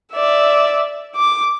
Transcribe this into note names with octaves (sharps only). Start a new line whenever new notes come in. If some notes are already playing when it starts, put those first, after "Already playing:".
D5 E5
D6